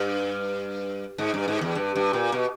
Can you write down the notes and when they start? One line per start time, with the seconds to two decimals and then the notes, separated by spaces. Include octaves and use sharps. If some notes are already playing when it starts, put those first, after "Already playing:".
Already playing: G2
1.18 G#2
1.34 G2
1.48 G#2
1.61 E2
1.75 G2
1.96 G2
2.13 A#2
2.32 B2